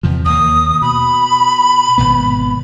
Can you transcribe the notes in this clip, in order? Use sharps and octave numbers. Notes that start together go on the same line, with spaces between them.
E2 C3 F3
D#2 A#3 D#6
B2 B5
G#1 B2 B3